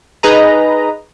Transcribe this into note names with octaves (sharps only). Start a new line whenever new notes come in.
D#4 G#4 B4 D#5 A#5